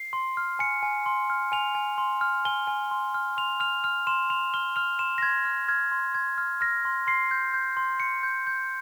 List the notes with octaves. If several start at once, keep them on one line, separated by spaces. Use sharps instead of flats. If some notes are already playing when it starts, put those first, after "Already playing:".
Already playing: C7
C6
F6
G#5 C#7
G#5
C6
F6
G#5 F7
G#5
C6
F6
G#5 G7
G#5
C6
F6
C6 F7
F6 F7
F6 F7
C6 E7
C6 F7
F6 G7
F6 F7
C6 E7
A#6
C6 G#6
F6
F6 G#6
C6
C6 G#6
F6
F6 A#6
C6
C6 C7
G6
G6
C6
C6 C#7
G6
G6